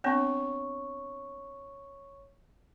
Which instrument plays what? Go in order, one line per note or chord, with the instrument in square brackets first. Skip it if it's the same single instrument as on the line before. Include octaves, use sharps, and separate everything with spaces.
[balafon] B3 C4 D4 [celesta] C#5 C#6